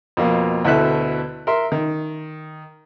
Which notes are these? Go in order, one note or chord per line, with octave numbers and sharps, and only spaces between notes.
F2 B2 A#3
D2 B2 E4 A4 E5 F#6
A#4 E5 C6
D#3